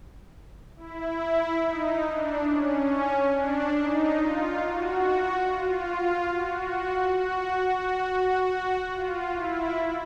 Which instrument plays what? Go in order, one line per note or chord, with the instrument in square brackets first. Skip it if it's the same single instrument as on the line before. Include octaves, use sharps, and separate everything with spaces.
[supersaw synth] E4
D#4
D4
C#4
D4
D#4
F4
F#4
F4
F#4
F#4
F#4
F4
E4